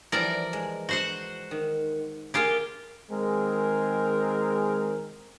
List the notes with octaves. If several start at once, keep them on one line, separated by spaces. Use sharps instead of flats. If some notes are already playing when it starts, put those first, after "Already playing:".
E3 F3 G3 A#4 D5
G#3
F#4 C5 F#5
D#3
A#3 F4 G4 G#4 A#5
D#3 G#3 C4 G#4 A#4